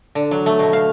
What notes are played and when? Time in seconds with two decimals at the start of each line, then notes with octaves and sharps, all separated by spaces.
0.15 D3
0.31 F#3
0.46 A3
0.59 B2
0.73 F5